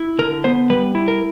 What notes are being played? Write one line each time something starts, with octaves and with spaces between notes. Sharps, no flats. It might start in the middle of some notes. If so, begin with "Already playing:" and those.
Already playing: E4
D3 A#4
B3 C5
G3 B4
E4
A#4